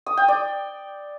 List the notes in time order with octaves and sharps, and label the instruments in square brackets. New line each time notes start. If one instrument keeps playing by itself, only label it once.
[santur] D#6
G5
D5